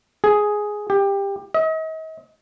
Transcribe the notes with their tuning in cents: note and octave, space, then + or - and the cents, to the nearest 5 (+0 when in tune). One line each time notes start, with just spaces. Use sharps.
G#4 +5
G4 +20
D#5 +40